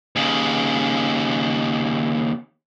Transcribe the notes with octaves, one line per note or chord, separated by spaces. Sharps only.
D#2 C#3